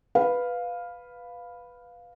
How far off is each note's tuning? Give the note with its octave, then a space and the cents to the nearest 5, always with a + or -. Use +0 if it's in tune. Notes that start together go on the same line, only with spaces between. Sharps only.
B4 +0 F5 +5